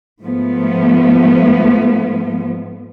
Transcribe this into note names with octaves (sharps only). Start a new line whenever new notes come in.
G#2 F3 A3 B3